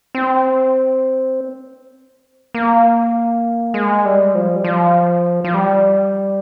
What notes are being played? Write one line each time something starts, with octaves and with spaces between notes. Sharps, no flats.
C4
A#3
G#3
G3
F3
G3
F3
F3
G3